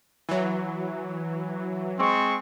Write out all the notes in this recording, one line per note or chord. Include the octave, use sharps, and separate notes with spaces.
E3 F#3
G#3 C4 C#6